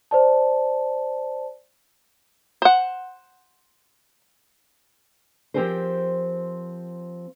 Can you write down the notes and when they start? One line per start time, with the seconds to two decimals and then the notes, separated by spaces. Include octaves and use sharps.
0.11 C5 D5 A5
2.62 C5 F#5
5.54 F3 C4 G4 G#4 A#4 C5